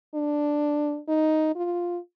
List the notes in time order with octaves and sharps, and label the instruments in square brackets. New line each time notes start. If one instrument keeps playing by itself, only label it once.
[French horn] D4
D#4
F4